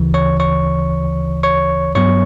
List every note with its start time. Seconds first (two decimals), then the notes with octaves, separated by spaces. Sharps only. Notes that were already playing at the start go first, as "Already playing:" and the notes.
Already playing: D2 C#3 E3
0.14 C#5 C#6
0.40 C#5 C#6
1.43 C#5 C#6
1.95 G2 F#3 B3 C#5 C#6